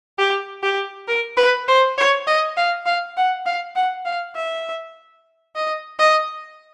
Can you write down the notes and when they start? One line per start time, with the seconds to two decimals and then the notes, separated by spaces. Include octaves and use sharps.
0.18 G4
0.63 G4
1.08 A#4
1.37 B4
1.68 C5
1.98 C#5
2.27 D#5
2.57 F5
2.86 F5
3.17 F#5
3.46 F5
3.75 F#5
4.05 F5
4.35 E5
5.56 D#5
5.99 D#5